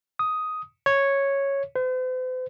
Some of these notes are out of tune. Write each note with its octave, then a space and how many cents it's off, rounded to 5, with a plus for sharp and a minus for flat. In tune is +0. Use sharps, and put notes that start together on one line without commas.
D#6 +5
C#5 -5
C5 -45